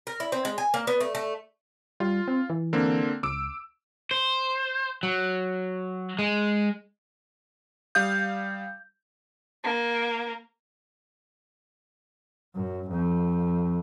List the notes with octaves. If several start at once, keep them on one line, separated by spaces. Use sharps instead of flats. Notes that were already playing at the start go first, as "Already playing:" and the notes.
A#4
E4
C4
G#3
G#5
A#3
B3
A3
A3
G3 F4
C4
E3
D3 A#3 C4
C#2 D6 E6 D7
C5
F#3
G#3
G3 F5 D#6 G6
A#3
F#2
F2